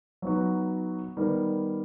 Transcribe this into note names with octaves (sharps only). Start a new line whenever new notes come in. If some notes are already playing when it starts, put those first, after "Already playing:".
F#3 B3 D#4 F#4
D#3 G3 B3